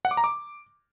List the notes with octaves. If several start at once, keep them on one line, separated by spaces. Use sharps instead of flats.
F#5
D6
A#5
D6